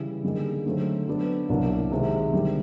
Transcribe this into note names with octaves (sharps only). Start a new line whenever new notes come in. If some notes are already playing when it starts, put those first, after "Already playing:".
Already playing: C#3 E3 G3
D3 G3 A#3 D#4 G#4
D3 F#3 A3 C4
F#3 B3 D4
C2 B2 F#3 A#3 D4
C3 D#3 G#3
D3 G3 A#3